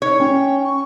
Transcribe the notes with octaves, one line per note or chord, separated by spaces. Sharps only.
D#4 C#5
C#4 G5
C#6